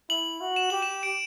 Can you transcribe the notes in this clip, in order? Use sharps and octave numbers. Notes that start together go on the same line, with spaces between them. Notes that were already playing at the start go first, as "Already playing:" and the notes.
E4 F#7
F#4
E7
G4 F#7
E7
D7